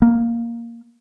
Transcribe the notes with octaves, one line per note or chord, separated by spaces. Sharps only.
A#3